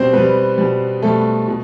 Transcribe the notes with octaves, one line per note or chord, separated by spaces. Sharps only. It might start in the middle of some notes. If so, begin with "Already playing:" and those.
Already playing: B2 G3 C4 C5
B2 G3 B3 B4
B2 G3
B2 G3 A3 A4
B2